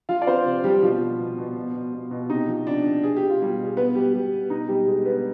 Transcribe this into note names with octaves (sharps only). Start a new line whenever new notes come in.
F3 F4 F5
D5
F3 C4 C5
C3
F3 G3 G4
B2 F3 F4
B2
B2
B2
B2
B2
B2
B2
C3 D#4
F3
C3 D4
C3
B2 G#4
B2 G4
F4
B2 G3 G4
B2
G#4
B2 B3 B4
B2 G3 G4
B2 G3 G4
B2
B2 D#4
B2 G3 G4
B2 G#3 G#4
B2 B3 B4